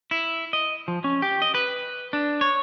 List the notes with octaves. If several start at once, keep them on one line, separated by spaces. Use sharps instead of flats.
E4
D#5
F3
C#4
G4
D#5
B4
D4
C#5